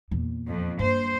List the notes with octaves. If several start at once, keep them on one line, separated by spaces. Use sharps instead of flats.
E2 A#2
F2
G2 A#3 C5